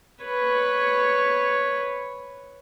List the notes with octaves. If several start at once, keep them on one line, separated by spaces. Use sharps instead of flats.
B4 C#5